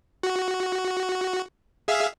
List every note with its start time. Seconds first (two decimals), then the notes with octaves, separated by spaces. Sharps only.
0.23 F#4
1.88 G#4 E5 F5